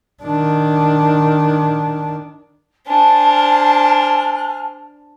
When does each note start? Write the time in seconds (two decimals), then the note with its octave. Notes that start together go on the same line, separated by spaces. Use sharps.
0.22 D#3 D4
2.87 D4 C5 G#5 A5 F6